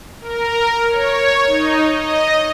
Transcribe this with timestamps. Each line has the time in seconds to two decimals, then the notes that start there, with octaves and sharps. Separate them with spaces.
0.21 A#4
0.90 C#5
1.47 D#4
1.89 D#5